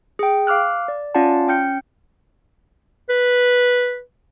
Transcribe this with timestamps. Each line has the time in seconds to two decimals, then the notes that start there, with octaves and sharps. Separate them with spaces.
0.19 G#4 G5
0.47 F5 D6 F6 F#6
0.88 D5
1.15 C#4 F4 D5 F5 F#5 A5
1.48 C#4 G5 F6 G6 C#7
3.09 B4